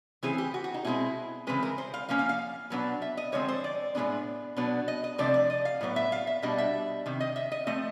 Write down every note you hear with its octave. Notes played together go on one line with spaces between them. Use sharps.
C#3 E3 A3 C4 G#4
G4
F#4
F#4
D#4
B2 G#3 C4 E4
C#3 E3 G#3 C4 B4
A#4
C5
F5
F3 A#3 C#4 F5
F5
F5
B2 F#3 B3 D4
E5
D#5
D3 F3 G#3 C4 C#5
C5
D5
A2 E3 G#3 B3 D4
B2 F#3 B3 D4
D#5
D#5
C3 F3 A3 D4 D5
D5
D#5
F5
A2 F#3 B3
E5
F5
E5
B2 G3 B3 D4 D#5
E5
C3 D#3
D#5
E5
D#5
F3 A3 C4 D#5